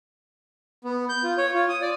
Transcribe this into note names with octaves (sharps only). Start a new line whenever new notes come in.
B3
G6
F4
C#5
F4
D#6
D5